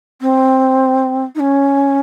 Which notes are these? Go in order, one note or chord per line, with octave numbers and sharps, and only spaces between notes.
C4
D#4
C#4